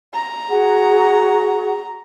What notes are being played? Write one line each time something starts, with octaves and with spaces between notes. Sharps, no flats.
A#5
F#4 G#4 F#5